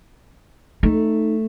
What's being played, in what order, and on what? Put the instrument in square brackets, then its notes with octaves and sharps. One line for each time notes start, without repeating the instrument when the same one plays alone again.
[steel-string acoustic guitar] A3 [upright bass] D#4